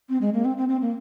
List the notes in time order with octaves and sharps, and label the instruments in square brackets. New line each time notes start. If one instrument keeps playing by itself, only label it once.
[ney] C4
G#3
A#3
C4
C4
C4
A#3